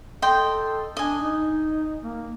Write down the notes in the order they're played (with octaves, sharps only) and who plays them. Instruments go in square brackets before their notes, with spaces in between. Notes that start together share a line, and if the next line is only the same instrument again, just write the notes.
[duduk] A4 [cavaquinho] D#5 G5 C6
[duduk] D4 [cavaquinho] D#5 G#5
[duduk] D#4
A#3